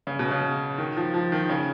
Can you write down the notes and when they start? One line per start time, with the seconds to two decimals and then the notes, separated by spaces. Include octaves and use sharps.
0.07 C#3
0.19 B2
0.31 C#3
0.78 D#3
0.97 F3
1.14 F3
1.32 D#3
1.49 C#3